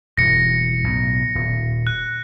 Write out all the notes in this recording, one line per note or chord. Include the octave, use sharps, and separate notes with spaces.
E1 G2 A#6 C#7
B1 A2
D#1
F#6